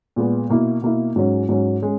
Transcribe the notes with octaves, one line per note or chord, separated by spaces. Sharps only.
A#2 G#3 B3
B2 A#3 E4
B2 A#3 E4
G#2 F#3 C#4
G#2 F#3 C#4
G#3 C#4